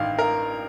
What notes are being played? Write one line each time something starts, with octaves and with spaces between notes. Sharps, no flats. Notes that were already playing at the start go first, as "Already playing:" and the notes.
Already playing: A1 G2 D#3 F5
A#4